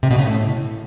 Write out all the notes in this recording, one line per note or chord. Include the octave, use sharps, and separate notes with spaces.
C3
B2
C#3
A2